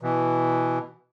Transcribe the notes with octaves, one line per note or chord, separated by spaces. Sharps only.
B2 E3